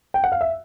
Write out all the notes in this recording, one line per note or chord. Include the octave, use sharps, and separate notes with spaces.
G5
F#5
F5
E5